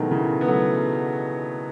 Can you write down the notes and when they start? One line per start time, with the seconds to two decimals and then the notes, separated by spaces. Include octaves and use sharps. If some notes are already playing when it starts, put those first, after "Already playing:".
Already playing: B2 D#3 E3 F#3 G#3 A3
0.11 C#3 E3
0.41 B3
0.48 F#3 A3